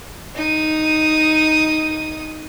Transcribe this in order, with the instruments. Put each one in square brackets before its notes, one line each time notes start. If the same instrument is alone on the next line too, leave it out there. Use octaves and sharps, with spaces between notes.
[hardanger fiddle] D#4 D#6